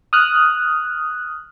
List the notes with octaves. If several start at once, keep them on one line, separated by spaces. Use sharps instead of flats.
D#6 F6 F#6